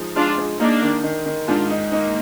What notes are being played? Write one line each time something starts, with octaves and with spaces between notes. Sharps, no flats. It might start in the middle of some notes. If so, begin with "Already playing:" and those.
Already playing: F3 G#3 D#4
G#3 D4 F4
G#3
A#3 D4 D#4
D#3
D#3
D#3
G#2 D4 F4
D#4
A#3 D#4